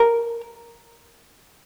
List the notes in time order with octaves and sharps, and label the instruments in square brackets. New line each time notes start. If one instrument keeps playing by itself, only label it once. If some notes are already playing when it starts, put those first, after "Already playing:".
Already playing: [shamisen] A#4